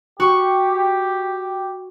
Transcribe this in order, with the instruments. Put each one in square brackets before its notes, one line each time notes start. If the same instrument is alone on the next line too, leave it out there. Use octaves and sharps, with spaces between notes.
[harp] F#4 C#6 [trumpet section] G4